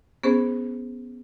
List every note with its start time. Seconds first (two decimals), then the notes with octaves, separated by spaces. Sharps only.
0.23 B3 C#4 G#4 C5